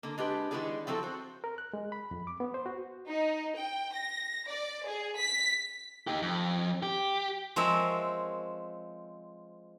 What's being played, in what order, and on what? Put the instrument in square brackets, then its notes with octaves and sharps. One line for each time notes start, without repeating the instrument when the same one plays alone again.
[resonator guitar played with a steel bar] D3 A#3
G#3 D4 G4 B4
D#3 G#3 B3 E4 G#4 D5
F3 F#3 C4 E4 A4
F#4 C5
[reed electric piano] A#4
F#6
G#3
B5
F2
D6
B3
C5
F#4
[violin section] D#4
G5
A#6
D5
G#4
B6
[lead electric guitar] D#4 G4
F2
G4
[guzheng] F3 G#3 C4 A#4 C#5 E5